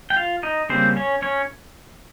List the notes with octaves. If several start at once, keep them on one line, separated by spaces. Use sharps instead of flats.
G5
F4 F5
D#4 D#5
C#3 G3 A#3 C4 C5
C#4 C#5
C#4 C#5